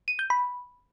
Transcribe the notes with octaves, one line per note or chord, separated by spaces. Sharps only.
D#7
G6
B5